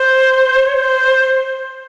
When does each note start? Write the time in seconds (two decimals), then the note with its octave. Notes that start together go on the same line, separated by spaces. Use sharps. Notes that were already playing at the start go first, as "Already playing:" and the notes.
Already playing: C5
0.66 C#5
0.77 C5